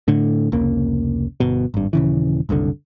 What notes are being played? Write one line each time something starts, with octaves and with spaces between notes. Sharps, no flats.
A2 D3
F1 C#2 C#3 A#3
G1 B2
G#1 G2
D#1 C#3 E3
F#1 C2 A#2 D3